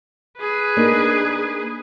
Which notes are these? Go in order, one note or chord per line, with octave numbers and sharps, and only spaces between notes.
G#4 B4
A#3 D4 D#4